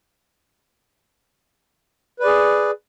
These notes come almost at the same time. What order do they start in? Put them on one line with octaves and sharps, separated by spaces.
B4 D5 G#4